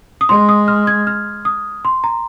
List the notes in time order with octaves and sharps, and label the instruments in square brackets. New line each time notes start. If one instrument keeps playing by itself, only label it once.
[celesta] D#6
[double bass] G#3 [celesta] C6
[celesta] D#6
F6
G#6
F6
D#6
C6
A#5